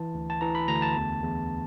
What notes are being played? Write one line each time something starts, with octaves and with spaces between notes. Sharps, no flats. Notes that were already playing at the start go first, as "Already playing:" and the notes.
Already playing: E3 A5
D2
A5
E3 A#5
B5
D2 A#5
A5
E2
E2